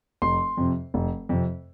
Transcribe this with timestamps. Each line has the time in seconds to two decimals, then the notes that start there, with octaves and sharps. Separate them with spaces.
0.22 F1 C6
0.57 F2 C3
0.94 F1
1.29 F2 C3